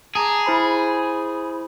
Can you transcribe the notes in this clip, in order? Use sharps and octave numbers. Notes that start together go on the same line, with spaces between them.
G#4 A5 A#5 D6
E4 C5 B5